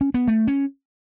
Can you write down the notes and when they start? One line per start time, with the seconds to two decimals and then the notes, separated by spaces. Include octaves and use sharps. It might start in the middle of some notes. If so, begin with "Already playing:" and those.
0.01 C#4
0.14 B3
0.28 A3
0.47 C#4